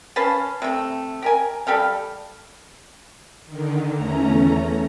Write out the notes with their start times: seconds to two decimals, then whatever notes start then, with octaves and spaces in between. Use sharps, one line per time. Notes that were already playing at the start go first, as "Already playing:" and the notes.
0.16 C#4 B4 F5 A5
0.62 C3 A3
1.22 G4 A#4 G#5
1.67 G3 G4 A4 F5
3.46 D3 D#3
3.96 E2 A3 C#4 A#5